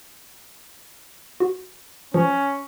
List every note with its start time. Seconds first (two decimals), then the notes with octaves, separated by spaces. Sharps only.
1.40 F#4
2.14 F3 C#4